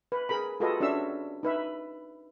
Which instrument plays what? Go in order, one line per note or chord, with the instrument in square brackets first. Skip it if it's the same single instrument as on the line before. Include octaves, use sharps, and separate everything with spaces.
[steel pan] B4
G#4 A#4 B5
F4 F#4 G#4 A4 B4 D#5
C#4 D4 F#4 E5 E6
D#4 B4 E5